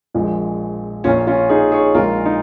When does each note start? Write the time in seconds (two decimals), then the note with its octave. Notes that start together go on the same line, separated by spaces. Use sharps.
0.14 A#1 A#2 F3 G#3
1.04 A#1 A#2 A#3 C#4 F4
1.27 C#4 F4
1.49 D#4 G#4
1.72 G#4 C#5
1.94 A#1 A#2 G#3 F4 A#4
2.26 D#4